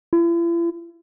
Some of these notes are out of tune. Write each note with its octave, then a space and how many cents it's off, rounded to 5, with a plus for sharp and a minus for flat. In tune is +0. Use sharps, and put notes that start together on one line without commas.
E4 +45